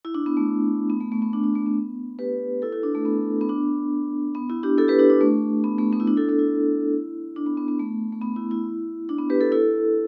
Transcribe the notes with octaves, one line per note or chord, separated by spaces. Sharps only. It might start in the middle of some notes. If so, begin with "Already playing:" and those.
E4
D4
B3
A3
B3
A3
A3
B3
D4
D4
A3
B3
G4 B4
E4 A4
E4
D4
A3
B3
B3
D4
B3
E4
D4 G4
E4 A4
G4 B4
D4 G4
D4
A3
B3
A3
B3
E4
D4
E4 A4
E4 A4
E4
D4
B3
B3
B3
A3
A3
B3
E4
E4
D4
B3
G4 B4
E4 A4
E4 A4